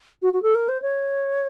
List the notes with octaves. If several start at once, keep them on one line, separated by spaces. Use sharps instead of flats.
F#4
F#4
A4
A#4
C5
C#5